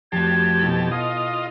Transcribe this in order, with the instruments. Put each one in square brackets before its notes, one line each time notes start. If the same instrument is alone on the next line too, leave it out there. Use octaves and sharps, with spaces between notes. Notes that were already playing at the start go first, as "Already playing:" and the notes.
[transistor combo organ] F2 G4 A5 [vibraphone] A3 F#4 [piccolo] G#6
[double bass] B2 [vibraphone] E4 A4
[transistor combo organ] F4 D#5 [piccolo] D#6